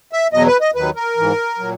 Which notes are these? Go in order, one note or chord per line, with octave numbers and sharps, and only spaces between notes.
E5
E2 B2 F#3 D#5
B4
D#5
D#2 D#3 F#3 B4
A#4
G#2 E3
A#2 F#3